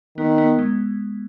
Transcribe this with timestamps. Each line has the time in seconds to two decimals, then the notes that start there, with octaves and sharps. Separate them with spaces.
0.18 D#3 B3
0.38 B3
0.59 G#3